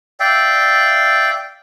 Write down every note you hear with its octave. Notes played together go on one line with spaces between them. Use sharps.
D5 E5 F5 G5